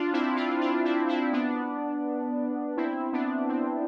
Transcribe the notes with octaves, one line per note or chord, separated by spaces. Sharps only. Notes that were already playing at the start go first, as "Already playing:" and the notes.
Already playing: D4 F4
C4 E4
D4 F4
D4 F4
C4 E4
C4 E4
B3 D4
C4 E4
B3 D4
C4